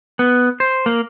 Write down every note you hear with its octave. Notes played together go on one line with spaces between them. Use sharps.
B3
C5
A#3